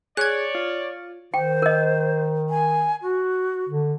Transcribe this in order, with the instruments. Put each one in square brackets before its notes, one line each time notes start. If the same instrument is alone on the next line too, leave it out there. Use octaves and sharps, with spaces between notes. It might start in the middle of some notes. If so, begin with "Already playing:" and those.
[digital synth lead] G#4 [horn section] C#5 D5 [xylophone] F#6 G#6
[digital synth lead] F4
[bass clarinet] D#3 [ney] C5 [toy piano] G5
[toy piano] A#4 D#5
[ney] G#5
F#4
[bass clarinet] D3